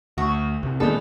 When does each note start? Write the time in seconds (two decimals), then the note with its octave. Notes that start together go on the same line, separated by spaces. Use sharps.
0.18 D2 F#4
0.63 C2 C3
0.80 A#2 D#3 G#3 B3 D4 D#4 A4